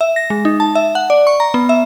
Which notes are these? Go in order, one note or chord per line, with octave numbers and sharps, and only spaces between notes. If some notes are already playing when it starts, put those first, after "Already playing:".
E5
A#6
G#3
D#4
A5
E5
F#5
D5
C#6
A#5
B3
E5